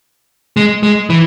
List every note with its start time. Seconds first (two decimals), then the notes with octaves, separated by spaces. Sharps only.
0.57 G#3
0.83 G#3
1.10 E3